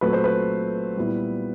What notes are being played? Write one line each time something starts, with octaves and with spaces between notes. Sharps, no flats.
A#2 F#3 A3 C4 B4
C5
B4
A#2 G3 B3 E4